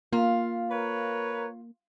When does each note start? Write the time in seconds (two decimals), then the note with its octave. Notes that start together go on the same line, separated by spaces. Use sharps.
0.13 A#3 F4 F5
0.71 A#4 B4 C#5